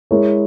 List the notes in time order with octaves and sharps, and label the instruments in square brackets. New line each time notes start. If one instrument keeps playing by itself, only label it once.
[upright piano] G#3 E4 A#4 C#5